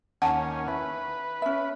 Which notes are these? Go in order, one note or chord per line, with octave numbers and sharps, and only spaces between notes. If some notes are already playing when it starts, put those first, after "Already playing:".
D#2 C#4 F#5 A5
E4 B4
C#4 E5